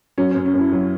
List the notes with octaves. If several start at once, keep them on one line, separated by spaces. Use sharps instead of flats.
F#3 C#4
F#2 C#4
C#4
F#2
E4
F#3